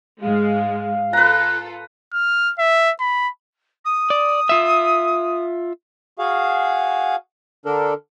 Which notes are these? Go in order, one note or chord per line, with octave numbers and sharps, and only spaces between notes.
G#2 G#3 F5
F4 A4 B4 A#5 F#6
F6
E5
B5
D#6
D5
F4 E5
F#4 G#4 F5
D3 D4 A4 A#4